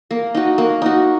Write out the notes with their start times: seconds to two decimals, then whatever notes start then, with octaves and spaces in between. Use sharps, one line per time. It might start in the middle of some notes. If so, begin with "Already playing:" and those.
0.11 A#3
0.35 D#4 F#4
0.58 A#3
0.82 D#4 F#4